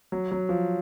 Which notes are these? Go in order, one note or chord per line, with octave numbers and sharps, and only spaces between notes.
F#3
F#3
F3